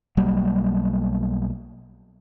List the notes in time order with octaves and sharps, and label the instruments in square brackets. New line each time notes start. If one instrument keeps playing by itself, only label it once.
[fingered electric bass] B1 F#3 G3 A#3